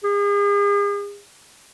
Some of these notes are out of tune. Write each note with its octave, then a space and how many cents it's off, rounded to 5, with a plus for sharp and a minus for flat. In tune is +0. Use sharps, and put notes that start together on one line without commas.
G#4 -40